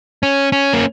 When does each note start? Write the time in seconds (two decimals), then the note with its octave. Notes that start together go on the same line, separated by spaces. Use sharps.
0.23 C#4
0.52 C#4
0.74 A#3